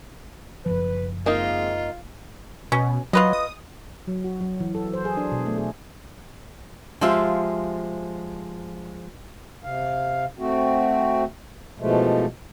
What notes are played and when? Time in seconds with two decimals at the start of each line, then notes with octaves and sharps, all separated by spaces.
0.66 F#1 C2 F3 B4
1.26 G#3 A#3 C4 D#4 F4 D#5
2.72 B2 C#4
3.13 F#3 F4 B4 D#5
3.33 D#6
4.08 F#3
4.24 F#4
4.41 F#3
4.60 E3
4.75 A4
4.93 C5
5.05 G#4
5.17 D4
5.32 B2
5.46 A3
5.58 G#4
7.01 F3 G#3 G4 C5 E5 F5
9.64 C3 F5
10.39 A3 C4 F#4
11.80 B2 E3 F3 G#3 A3